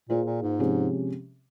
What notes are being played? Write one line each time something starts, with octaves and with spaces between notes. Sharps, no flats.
A#2 A#3 F4 G#4 C5
A#2
G#2
C3 F3 G#3 C#4 G4